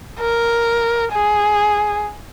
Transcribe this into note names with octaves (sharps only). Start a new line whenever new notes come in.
A#4
G#4